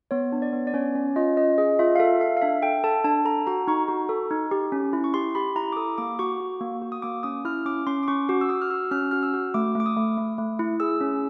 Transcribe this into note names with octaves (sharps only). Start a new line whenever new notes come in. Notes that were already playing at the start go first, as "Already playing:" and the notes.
B3 C#5
D4
D5
B3
D5
C#4 C#5
C#4
F4 D#5
C#4 D#5
G#4 D#5
F4 E5
F5
A4 E5
A4 F5
F5
D4 E5
A4 G5
A4 A5
D4 A5
A4 A#5
F#4 A#5
D#4 C#6
F#4
A4
D#4
G4
C#4
E4
C#6
G4 C6
G4 B5
E4 A#5
D6
A4 D#6
A#3 D6
F#4 C#6
F#4
A#3
F#4
D#6
A#3 D6
C#4 D#6
E4 F6
C#4 D6
C#4 C6
D6
C#4 C#6
F#4 D6
E6
F#4 D#6
F6
F#4 E6
C#4 F6
F#4 F6
E6
F#4
A3 D6
A3 D6
D#6
A3
A3
A3
E4
G#4 E6
C#4